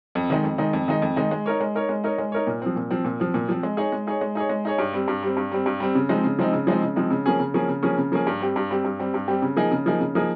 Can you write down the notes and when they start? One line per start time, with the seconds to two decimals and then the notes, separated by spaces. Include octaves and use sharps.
0.15 F2
0.30 D#3 G#3 D#4
0.44 F2
0.58 D#3 G#3 D#4
0.73 F2
0.88 D#3 G#3 D#4
1.02 F2
1.16 D#3 G#3 D#4
1.31 G#3
1.46 D#4 A#4 C#5
1.61 G#3
1.75 D#4 A#4 C#5
1.89 G#3
2.04 D#4 A#4 C#5
2.18 G#3
2.32 D#4 A#4 C#5
2.47 A#2
2.62 F3 C4
2.76 A#2
2.91 F3 C4
3.05 A#2
3.20 F3 C4
3.34 A#2
3.49 F3 C4
3.63 G#3
3.77 D#4 G#4 C#5
3.92 G#3
4.07 D#4 G#4 C#5
4.21 G#3
4.35 D#4 G#4 C#5
4.49 G#3
4.65 D#4 G#4 C#5
4.78 G2
4.93 G3 C4
5.08 G2
5.23 G3 C4
5.37 G2
5.52 G3 C4
5.66 G2
5.80 G3 C4
5.95 C#3
6.09 F3 G#3 C4 D#4
6.24 C#3
6.39 F3 G#3 C4 D#4
6.53 C#3
6.67 F3 G#3 C4 D#4
6.82 C#3
6.96 F3 G#3 C4 D#4
7.10 C#3
7.26 F3 A#3 C#4 G#4
7.39 C#3
7.54 F3 A#3 C#4 G#4
7.68 C#3
7.83 F3 A#3 C#4 G#4
7.97 C#3
8.12 F3 A#3 C#4 G#4
8.27 G2
8.40 G3 C4 G4
8.56 G2
8.70 G3 C4 G4
8.85 G2
8.99 G3 C4 G4
9.14 G2
9.28 G3 C4 G4
9.42 C#3
9.57 F3 A#3 D#4 G#4
9.72 C#3
9.86 F3 A#3 D#4 G#4
10.00 C#3
10.15 F3 A#3 D#4 G#4